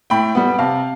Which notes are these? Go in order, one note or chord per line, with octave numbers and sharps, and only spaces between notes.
A2 G5 B5
G3 B3
C3 F5 A5